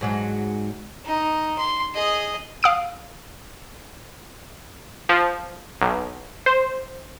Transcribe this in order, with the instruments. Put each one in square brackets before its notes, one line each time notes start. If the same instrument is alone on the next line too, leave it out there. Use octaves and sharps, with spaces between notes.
[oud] G#2 F#3 G#3
[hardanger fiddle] D#4
C6
G#4 D#5
[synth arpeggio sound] F5 D#6 D7
[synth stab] F3
B1
C5